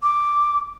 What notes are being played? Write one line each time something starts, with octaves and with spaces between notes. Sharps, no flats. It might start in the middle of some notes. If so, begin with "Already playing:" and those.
D6